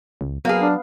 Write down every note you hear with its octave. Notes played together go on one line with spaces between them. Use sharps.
C#2
F#3 A#3 B3 G#4 F5
D4